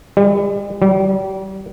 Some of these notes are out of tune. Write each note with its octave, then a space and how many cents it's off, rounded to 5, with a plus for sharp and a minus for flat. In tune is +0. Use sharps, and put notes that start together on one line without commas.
G3 +40
G3 -35